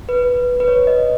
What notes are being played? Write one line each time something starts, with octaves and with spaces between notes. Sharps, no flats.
B4
B4
C#5
D#5